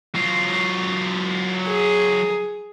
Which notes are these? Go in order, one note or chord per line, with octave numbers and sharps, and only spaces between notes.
F#3 F4
G#4